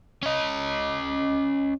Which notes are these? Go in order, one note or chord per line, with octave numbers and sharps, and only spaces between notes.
C#4 D#5